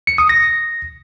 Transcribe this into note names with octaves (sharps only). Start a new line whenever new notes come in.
C#7
D#6
A#6